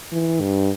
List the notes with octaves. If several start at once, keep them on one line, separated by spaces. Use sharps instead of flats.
E3
G2